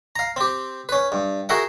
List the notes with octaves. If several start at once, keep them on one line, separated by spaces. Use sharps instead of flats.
F5 A#5
C4 G4
C#4 B4
G2
F#4 G#4 A#4 E5 F#5 G5